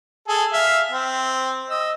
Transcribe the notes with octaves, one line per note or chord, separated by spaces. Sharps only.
G#4 A4
E5 F5
C4
D#5 E6